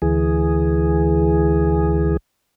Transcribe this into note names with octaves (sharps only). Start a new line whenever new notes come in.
D2 E3 G#4